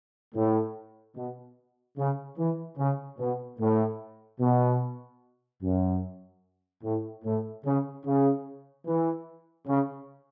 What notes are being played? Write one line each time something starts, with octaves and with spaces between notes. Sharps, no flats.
A2
B2
C#3
E3
C#3
B2
A2
B2
F#2
A2
A2
C#3
C#3
E3
C#3